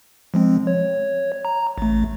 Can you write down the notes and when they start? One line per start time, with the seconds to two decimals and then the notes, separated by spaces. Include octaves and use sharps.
0.34 F3 G#3 C4
0.67 C#5
1.45 A#5
1.78 A1 A3